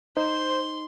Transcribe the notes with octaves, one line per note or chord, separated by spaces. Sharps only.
D#4 C5 C6